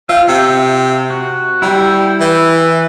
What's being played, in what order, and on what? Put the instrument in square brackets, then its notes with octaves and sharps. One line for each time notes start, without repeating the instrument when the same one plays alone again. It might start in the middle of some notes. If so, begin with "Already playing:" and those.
[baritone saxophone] F4 [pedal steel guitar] E5 G5
[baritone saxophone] C3
[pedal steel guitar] F#4
[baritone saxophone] G3 [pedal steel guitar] E4 G5
[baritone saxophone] E3